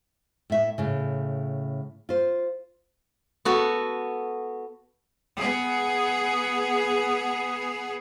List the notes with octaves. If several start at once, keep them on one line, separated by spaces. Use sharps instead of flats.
A2 E5
A2 C#3
F4 C5
B3 F#4 A4
B3 G#4